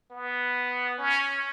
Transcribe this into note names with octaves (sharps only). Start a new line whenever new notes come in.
B3
C#4